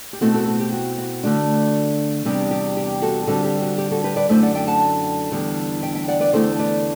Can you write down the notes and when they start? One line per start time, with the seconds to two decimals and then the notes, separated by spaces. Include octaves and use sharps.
0.13 G4
0.21 B2 A3 C4 E4 F#4 A4
0.34 F#4 A4
0.47 F#4
0.60 G4
0.73 F#4
0.98 F#4
1.23 D3 A3 D4
2.25 E2 C3 G3 B3 D4 G4
2.51 G4
2.77 G4
3.02 F#4 A4
3.27 D3 G3 C4 F#4 A4
3.44 G4
3.62 F#4
3.78 G4
3.91 F#4 A4
4.04 G4 B4
4.16 B4 D5
4.29 F#2 D3 A3 E4 C5 E5
4.42 D5 F#5
4.55 E5 G5
4.67 F#5 A5
5.32 E2 D3 G3
5.82 E5 G5
5.95 E5 G5
6.08 D5 F#5
6.20 B4 D5
6.33 E2 D3 A3 E4 A4 C5
6.59 B4 D5